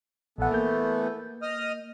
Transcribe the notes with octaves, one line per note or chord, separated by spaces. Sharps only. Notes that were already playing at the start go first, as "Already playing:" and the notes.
A#1 E3 A3 B3 F#5
A#3 G6
D#5 D#6 F6